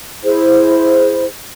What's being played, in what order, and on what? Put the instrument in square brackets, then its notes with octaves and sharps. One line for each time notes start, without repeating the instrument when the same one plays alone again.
[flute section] E4 G#4 C5